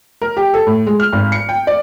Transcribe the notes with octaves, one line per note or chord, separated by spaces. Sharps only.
A#4
G4
A4
A2
G#3
F6
G#1
C#7
G5
D5